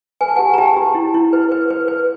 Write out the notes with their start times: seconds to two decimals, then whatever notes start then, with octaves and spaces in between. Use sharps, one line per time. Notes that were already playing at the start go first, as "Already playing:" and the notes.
0.21 B4 G#5
0.28 A5
0.36 G4 F#5 G#5
0.54 A#5
0.58 G4 G5 A5
0.77 G4
0.95 E4
1.14 E4
1.33 B4
1.52 B4
1.70 B4
1.88 B4